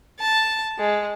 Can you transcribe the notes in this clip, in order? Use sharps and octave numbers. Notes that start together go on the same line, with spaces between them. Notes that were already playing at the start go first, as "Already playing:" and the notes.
A5
G#3